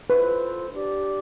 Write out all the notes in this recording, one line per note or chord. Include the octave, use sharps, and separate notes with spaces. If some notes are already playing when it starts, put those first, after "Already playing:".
F4 A4 B4 C5
D4 G4 D5